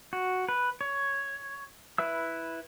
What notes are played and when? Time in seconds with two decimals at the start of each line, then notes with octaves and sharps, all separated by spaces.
0.13 F#4
0.49 B4
0.81 C#5
1.98 E4 B4 E5 E6